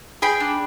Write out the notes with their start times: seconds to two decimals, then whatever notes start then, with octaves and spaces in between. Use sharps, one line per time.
0.22 G#4 G5 B5
0.40 D4